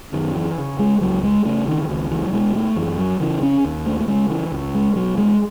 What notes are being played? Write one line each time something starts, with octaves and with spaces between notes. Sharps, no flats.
F#2 D#3
E3
C#3
G#3
C#2 F#3
G#3
C#3 A3
D#3
E3
C#2 D#3
E3
F#3
B2 G#3
A3
F#2 E3
F#3
C#3 E3
C#4
D#2
A3
A3
C#3 G#3
E3
C#2
G#3
B2 F#3
G#3